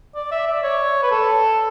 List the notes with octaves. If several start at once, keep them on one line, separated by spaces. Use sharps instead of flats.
D5
E5
D5
C#5
B4
A4